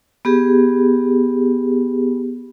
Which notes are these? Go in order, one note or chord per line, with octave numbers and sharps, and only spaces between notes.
B3 G4 G#4